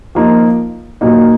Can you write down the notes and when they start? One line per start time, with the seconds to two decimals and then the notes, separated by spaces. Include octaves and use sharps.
0.15 F3 A#3 D#4
1.01 A#2 F#3 A#3 D#4